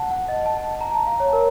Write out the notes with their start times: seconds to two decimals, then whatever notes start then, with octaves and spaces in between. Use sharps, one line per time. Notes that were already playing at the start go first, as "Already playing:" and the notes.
Already playing: F#5 A5
0.11 F#5
0.28 D#5
0.46 A5
0.63 A5
0.81 A#5
0.94 A5
1.07 F5
1.20 C#5
1.33 A#4